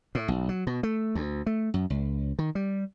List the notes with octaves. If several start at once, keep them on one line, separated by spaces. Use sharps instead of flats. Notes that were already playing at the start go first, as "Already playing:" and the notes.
A2
B1
F#3
B2
A3
D2
A3
F#2
C#2
D#3
G3